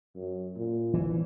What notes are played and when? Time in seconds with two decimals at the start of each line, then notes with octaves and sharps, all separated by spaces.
0.15 F#2
0.56 A#2
0.94 E3